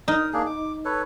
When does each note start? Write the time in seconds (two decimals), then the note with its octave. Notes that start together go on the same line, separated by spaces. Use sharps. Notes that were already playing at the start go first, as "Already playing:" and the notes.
0.08 D#4 A#4 D#6
0.33 A#3 D4 G#4
0.46 D6
0.85 A4 B4 C#5